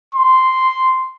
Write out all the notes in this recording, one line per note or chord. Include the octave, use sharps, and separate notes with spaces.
C6